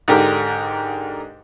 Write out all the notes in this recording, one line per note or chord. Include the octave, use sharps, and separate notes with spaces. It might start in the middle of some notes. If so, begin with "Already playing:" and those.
G#2 D3 G4 A#4